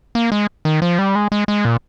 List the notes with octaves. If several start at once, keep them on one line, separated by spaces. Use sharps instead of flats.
A#3
G#3
D#3
F3
G3
G#3
G#3
G#3
A#2